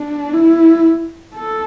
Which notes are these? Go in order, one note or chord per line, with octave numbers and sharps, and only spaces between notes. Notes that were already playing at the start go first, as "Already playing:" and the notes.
Already playing: D4
E4
A4